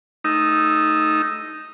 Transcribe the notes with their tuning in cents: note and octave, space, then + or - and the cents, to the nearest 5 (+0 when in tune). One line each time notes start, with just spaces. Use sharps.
A3 -20 D#4 +0 E6 +5